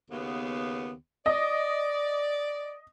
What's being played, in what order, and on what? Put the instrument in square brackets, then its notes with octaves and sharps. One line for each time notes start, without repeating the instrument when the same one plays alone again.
[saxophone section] D#2 C#3 B3
[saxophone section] D5 [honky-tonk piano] D#5